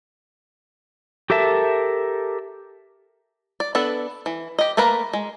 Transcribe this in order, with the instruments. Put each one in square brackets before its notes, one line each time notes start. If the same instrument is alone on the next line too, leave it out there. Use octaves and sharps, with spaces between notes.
[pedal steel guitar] G4 A4 A#4 E5 A5
[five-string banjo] D5
B3 D4 A4 B4
E3
G4 D#5
A3 A#3 A#4 B4 A#5
G#3